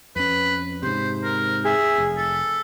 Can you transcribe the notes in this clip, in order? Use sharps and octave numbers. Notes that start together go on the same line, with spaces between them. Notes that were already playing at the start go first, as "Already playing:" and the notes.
F2 C#4 B4
G#2 C3 C5
A#4
G#4 E5
F1
A4